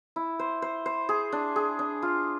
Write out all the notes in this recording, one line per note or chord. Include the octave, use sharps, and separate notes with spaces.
E4
C5
C5
C5
G#4
D4
G#4
D4
F4